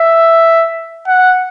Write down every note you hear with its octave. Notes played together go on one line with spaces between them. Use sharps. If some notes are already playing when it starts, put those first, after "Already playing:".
Already playing: E5
F#5